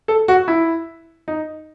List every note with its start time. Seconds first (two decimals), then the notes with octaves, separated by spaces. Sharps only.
0.08 A4
0.28 F#4
0.48 E4
1.28 D#4